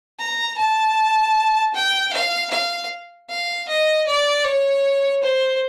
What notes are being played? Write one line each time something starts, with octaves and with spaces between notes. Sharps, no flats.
A#5
A5
G5
F5
F5
F5
D#5
D5
C#5
C5